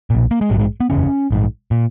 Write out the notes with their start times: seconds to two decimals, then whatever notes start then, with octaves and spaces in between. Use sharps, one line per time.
0.10 B1 A#2
0.31 A#3
0.41 G#3
0.50 A#1 G#2 F#3
0.60 G#3
0.80 B3
0.90 F#1 E2 C#3 C#4
1.31 A#1 G#2
1.71 A#2